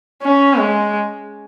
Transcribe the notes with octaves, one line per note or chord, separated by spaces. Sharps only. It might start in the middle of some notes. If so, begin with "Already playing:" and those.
C#4
G#3